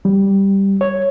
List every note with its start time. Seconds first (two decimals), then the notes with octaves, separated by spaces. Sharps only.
0.05 G3
0.81 C#5